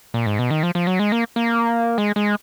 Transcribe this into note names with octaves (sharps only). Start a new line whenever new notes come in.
A#2
G#2
B2
D#3
F3
F3
F#3
G#3
A#3
A#3
G#3
G#3